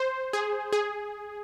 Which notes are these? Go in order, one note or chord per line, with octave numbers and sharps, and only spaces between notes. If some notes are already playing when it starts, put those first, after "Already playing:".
Already playing: C5
G#4
G#4